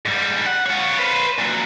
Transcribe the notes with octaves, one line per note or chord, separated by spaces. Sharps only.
G#2 G3
F#5
F4 C#5
B4 C5
A#2 F#3